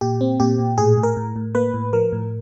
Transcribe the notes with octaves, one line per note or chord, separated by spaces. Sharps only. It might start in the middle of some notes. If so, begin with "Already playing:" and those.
A#2 G4
C4
A#2 G4
A#2
A2 G#4
A2
A#4
A2
A2
A#3 B4
A2
F3 A#4
A2